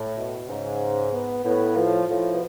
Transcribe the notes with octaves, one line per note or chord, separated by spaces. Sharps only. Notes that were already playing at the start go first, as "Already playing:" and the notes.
Already playing: A2
B2
G#2 C#3
B3
A2 B3
F3
A2 F3
B2